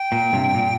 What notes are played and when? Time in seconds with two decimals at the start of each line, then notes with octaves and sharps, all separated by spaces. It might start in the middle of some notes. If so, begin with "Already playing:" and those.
Already playing: G5
0.12 A#2
0.33 G2 C3
0.55 A#2